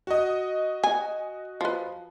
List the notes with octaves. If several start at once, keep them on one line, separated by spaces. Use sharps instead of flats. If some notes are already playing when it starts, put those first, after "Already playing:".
F#4 D#5
G#5
F3 B4